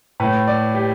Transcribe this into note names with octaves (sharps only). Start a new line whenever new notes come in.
A2 A3 B4
D5
G4